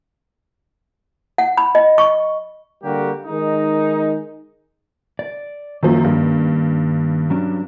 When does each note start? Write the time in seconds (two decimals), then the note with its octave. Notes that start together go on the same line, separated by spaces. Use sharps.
1.38 F#5
1.57 B5
1.75 D#5
1.98 C#6
2.83 D3 G3 A#3 F#4 G4
3.26 D#3 G#3 D#4
5.19 D5
5.83 F#2 D#3 F3 A#3 C#4
6.04 G2
7.30 F#3 C#4 D4